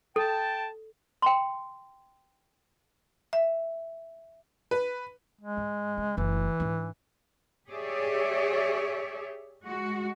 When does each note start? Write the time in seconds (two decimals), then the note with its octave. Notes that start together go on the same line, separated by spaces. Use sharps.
0.16 A4 G5 A5
1.22 G5 A#5 C6
3.33 E5
4.71 B4
5.41 G#3
5.57 G#2
5.97 C#3
6.17 F#1 E3 A3
6.60 G#2 D4
7.69 G4 G#4 C#5 D5 E5
9.62 G#3 F#4